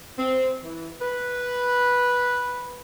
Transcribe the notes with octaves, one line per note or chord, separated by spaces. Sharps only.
C4
E3
B4